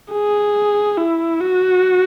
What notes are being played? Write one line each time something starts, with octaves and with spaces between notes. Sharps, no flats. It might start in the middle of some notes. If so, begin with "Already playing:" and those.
G#4
E4
F#4